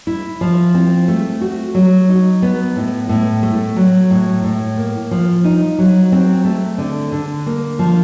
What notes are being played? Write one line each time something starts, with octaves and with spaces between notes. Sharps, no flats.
E4
F3
C4
A3
F#4
F#3
D#4
B3
A2
A2
A3
F#3
A2
A2
A#3
F3
D#4
F#3
C4
A3
D3
D3
A#3
F3